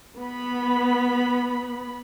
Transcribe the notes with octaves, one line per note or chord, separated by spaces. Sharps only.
B3 B5